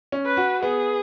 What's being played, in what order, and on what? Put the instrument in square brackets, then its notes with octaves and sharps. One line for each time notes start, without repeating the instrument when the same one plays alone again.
[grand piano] C#4
[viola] B4
[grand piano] F#4
[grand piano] B3 [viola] G#4